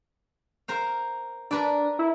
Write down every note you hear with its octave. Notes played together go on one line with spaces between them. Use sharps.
A#4 C5 F5
D4 A#4 B4 D5
E4